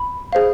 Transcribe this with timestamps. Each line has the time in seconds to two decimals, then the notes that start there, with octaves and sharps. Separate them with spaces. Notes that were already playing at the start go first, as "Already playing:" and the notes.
Already playing: B5
0.33 G#4 C5 F5